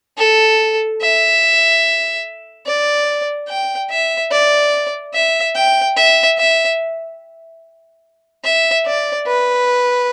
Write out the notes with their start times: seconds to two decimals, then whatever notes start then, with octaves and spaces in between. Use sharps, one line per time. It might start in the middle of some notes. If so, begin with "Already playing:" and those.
0.18 A4
1.01 E5
2.66 D5
3.48 G5
3.90 E5
4.31 D5
5.14 E5
5.55 G5
5.96 E5
6.38 E5
8.44 E5
8.86 D5
9.27 B4